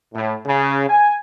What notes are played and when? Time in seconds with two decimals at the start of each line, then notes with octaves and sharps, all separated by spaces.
0.14 A2
0.46 C#3
0.89 G#5